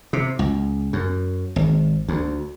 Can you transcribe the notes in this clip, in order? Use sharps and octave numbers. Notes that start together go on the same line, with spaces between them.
C3
C#2
F#2
G#1
D2